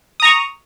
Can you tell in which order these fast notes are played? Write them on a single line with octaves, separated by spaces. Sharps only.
D#6 A#5 C#6